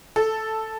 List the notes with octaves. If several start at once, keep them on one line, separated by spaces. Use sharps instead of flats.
A4